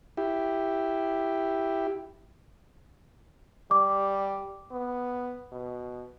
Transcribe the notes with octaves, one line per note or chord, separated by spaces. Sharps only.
E4 G4
G3 D6
B3
B2